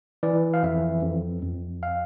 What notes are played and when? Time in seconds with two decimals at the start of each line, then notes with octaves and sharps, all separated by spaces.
0.23 E3 D5
0.54 F5
0.63 F2 E5
1.02 F2
1.42 F2
1.83 F5